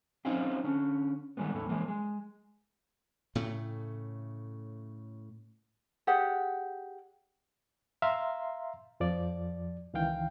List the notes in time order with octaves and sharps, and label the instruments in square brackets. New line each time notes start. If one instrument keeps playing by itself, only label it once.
[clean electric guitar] C4 C#4 D#4 F4 G4
D3 C#4
D#3 G3 G#3 B3
E2 A2 E3 A3
E3 G#3 A#3
G#3
[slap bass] A2 C#3 A3
[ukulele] G4 G#4 D5 F#5
[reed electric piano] E5 F5 A#5 C6
F2 F3 D5
C#2 D#3 E3 F5 G5